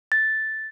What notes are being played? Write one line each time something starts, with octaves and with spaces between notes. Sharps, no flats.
A6